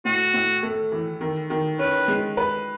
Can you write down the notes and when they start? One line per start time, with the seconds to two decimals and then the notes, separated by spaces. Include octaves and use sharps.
0.05 A2 F#4
0.34 A2
0.63 A3
0.92 E3
1.21 D#3
1.50 D#3
1.79 C#4 B4
2.08 G#3
2.37 B4